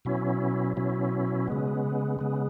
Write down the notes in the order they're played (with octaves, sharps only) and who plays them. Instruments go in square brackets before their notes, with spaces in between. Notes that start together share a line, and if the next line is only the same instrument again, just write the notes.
[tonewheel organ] B2 F#3 C#4 E4
B2 F#3 C#4 E4
C#3 G#3 B3
C#3 G#3 B3